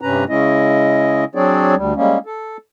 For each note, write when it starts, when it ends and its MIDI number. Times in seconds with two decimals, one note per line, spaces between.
0.01 0.24 43
0.01 0.24 48
0.01 0.24 61
0.01 0.24 71
0.01 0.24 82
0.29 1.24 49
0.29 1.24 56
0.29 1.24 61
0.29 1.24 64
0.29 1.24 75
1.35 1.75 54
1.35 1.75 60
1.35 1.75 62
1.35 1.75 68
1.35 1.75 73
1.35 1.75 74
1.76 1.93 38
1.76 1.93 55
1.96 2.18 55
1.96 2.18 56
1.96 2.18 58
1.96 2.18 61
2.26 2.57 69